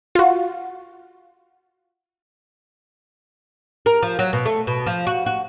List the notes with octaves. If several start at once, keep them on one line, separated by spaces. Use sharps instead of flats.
F4 F#4
A#4
F3
F#3
B2
A3
B2
F3
F#4
F#4